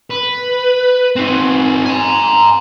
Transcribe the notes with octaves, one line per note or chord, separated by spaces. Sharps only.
B4
C4 D#4
G#5 A#5